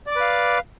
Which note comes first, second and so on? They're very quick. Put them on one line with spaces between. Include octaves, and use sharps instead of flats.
D5 D6 B4 F5